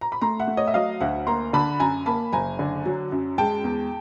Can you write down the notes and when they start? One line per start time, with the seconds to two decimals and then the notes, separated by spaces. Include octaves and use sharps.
0.01 A#5
0.12 B5
0.22 A3 A#5 C6
0.39 E5 F#5
0.48 A3
0.57 C#5 D#5
0.67 E5
0.74 F#3 D#5 F5
1.01 D2 E5 F#5
1.27 A#3 A#5 C6
1.53 D3 A5 B5
1.80 F#2 G#5 A#5
2.06 A#3 A5 B5
2.33 F#1 G#5 A#5
2.59 D3
2.86 F#3
3.12 F#2
3.38 G#3 G5 A5
3.64 E2